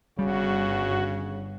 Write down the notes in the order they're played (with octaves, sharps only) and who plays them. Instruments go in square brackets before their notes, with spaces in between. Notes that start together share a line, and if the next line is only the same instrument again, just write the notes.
[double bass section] G1 [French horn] C#3 [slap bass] G3 [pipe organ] F#4